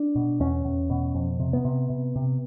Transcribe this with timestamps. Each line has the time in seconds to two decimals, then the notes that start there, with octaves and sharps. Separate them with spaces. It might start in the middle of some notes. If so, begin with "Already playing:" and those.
Already playing: D4
0.16 B2
0.40 E2 C#4
0.65 E2
0.90 B2
1.15 F2
1.40 C3
1.53 B3
1.65 C3
1.90 C3
2.16 C3